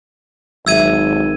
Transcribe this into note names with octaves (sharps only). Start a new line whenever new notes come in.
G#1 F#3 E5 E6 G#6 D#7